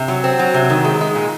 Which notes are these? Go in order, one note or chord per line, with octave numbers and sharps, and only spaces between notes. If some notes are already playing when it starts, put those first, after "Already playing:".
Already playing: C3
F#3
C4
F#3
C3
D#3
G#3
G#3
A#2